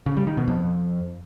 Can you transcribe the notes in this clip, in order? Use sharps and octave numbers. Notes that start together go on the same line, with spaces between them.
C#3
G3
D#3
B2
F2